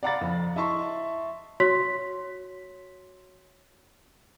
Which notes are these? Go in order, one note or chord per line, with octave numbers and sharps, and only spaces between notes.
D5 F5 F#5 A#5 B5 A6
F2
E4 D#5 E5 A5 C6 C#6
F#4 C#5 C6 B6